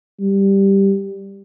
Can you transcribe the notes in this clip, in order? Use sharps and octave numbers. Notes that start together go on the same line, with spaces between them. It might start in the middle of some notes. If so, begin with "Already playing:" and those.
G3